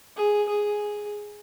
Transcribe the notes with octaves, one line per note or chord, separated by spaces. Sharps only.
G#4
G#4